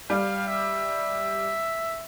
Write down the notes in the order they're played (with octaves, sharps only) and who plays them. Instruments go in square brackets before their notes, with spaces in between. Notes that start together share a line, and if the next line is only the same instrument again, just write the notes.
[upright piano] G3 [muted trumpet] F5
[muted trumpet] E5